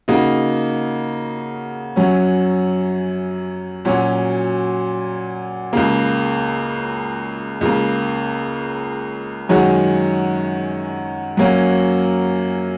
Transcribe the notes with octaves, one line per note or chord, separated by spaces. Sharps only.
C#3 A#3 D#4 F#4
F#2 F#3 C#4
A#2 F#3 C#4 F#4
C#2 C#3 A#3
C#2 C#3 A#3
F#2 D#3 G#3 C#4 F#4
F#2 F#3 A#3 C#4